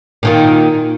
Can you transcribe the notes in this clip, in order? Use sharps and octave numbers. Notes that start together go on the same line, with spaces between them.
A#2 D#3 F4